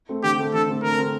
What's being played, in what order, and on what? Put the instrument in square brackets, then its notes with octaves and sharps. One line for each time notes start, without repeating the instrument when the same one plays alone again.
[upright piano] A3 C4
[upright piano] D3 [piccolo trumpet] G4
[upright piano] A3 C4
[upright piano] D3 [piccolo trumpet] A4
[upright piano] A3 C4
[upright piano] D3 [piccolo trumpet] A#4
[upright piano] A3 C4